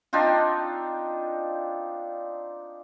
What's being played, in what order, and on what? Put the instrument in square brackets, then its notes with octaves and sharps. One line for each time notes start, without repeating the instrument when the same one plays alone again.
[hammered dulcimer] C4 D4 D#4 F4